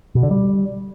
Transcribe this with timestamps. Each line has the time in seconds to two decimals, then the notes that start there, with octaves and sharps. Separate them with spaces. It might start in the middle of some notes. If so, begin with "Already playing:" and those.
0.15 B2
0.23 D3
0.31 G3